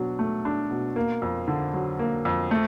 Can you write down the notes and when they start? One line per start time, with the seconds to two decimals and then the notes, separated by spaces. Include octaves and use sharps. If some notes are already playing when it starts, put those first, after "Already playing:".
Already playing: B2 F#3 D4
0.19 A3
0.45 D4
0.70 B2
0.96 A#3
1.22 F2
1.48 D3
1.74 F#3
1.99 A#3
2.25 F2
2.51 A3